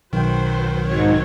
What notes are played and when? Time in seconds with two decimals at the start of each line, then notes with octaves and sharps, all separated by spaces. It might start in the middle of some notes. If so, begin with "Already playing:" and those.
0.13 B1 D#3 F#3 B4 C5 G5
0.87 G#2 F#3 C4 C#5